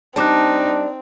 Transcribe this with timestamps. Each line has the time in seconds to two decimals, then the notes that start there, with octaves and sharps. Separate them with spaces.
0.16 G3 C4 D4 D#4 A5 D6 F#6